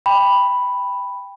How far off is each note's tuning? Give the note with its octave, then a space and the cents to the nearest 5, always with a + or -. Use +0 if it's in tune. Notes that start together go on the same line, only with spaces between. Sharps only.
G5 +20 B5 +0